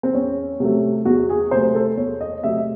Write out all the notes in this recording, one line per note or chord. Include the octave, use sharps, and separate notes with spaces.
C4
E2 C#4
C3 F#3 A3
E2 F#4
G#4
C3 F#3 A3 C5
A4
E2 C#5
D#5
C3 F#3 A3 E5